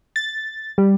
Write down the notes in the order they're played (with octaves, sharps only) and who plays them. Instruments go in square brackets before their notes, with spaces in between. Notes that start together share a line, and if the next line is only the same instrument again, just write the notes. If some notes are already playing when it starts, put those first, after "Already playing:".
[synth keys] A6
G3